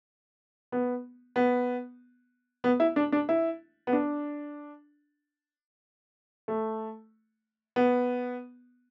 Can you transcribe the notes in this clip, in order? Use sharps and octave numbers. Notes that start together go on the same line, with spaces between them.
B3
B3
B3
E4
D4
D4
E4
B3
D4
A3
B3